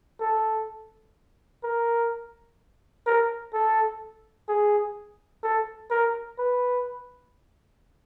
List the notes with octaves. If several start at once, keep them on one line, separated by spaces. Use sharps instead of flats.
A4
A#4
A#4
A4
G#4
A4
A#4
B4